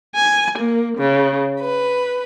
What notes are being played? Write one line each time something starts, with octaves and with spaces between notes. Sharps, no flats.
G#5
A#3
C#3
B4